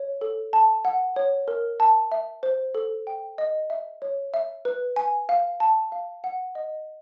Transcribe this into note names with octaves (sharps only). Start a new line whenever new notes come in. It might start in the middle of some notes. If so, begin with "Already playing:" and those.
Already playing: C#5
A4
A5
F#5
C#5
A#4
A5
E5
C5
A4
G5
D#5
E5
C#5
E5
B4
G#5
F5
A5
F5
F#5
D#5